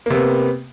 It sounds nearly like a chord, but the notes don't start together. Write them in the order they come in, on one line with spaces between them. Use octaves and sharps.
A#3 C3 B3